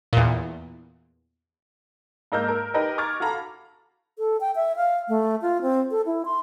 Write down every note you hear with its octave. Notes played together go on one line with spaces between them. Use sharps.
E2 A#2
G#2 A#3 D#5 E6 F6 G6
A#4
D#4 G4 A#4 B4 D#5
A#5 C#6 D6 F6 G#6 A6
F#4 A4 F5 A#5 B5
A4
G5
E5
F5
A3
F4
C4
A4
E4
C6